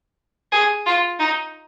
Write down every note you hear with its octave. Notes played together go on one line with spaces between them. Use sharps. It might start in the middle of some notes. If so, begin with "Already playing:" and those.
G#4
F4
D#4